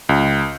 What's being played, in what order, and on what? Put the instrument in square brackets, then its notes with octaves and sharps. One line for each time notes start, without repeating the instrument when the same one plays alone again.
[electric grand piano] C#2